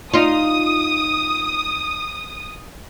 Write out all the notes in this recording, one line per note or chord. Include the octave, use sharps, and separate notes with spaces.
D#4 F4 D#6